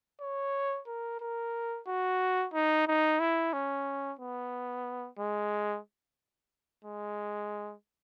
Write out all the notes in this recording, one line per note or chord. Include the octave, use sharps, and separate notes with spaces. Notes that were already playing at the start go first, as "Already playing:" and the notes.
C#5
A#4
A#4
F#4
D#4
D#4
E4
C#4
B3
G#3
G#3